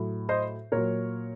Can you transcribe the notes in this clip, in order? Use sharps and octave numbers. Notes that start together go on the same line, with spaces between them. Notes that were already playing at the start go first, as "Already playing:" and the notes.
Already playing: A2 F#3
C5 D#5
A#2 F#3 A#4 C#5